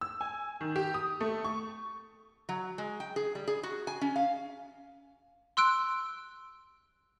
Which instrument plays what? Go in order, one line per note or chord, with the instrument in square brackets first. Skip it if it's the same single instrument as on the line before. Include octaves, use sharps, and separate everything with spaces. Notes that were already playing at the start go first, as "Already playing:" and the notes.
[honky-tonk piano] E6
G#5
D#3
G4
D#6
A3
C#6
[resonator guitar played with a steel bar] F#3
G#3
G5
G#4
G3
G#4
F#4
G#5
C#4
F5
[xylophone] C6 E6 F#6 D7